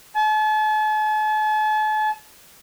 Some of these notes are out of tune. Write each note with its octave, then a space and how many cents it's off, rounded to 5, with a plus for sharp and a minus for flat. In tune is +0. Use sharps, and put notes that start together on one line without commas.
A5 -45